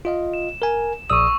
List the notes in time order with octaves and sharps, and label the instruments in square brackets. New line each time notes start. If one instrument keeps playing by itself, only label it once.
[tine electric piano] F4 D#5 F5
[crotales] E7
[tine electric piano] A#4 G#5
[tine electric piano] A#1 D5 D#6 [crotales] C#6 E6